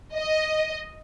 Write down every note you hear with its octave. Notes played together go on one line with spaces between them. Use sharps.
D#5